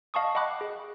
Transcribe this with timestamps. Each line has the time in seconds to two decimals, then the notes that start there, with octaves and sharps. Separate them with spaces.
0.14 D#5 F5 A5 C#6 D#6
0.35 D#5 F#5 G5 B5 D6 F#6
0.61 G#4